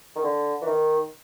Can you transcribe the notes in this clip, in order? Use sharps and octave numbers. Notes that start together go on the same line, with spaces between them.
D#3
D3
E3
D#3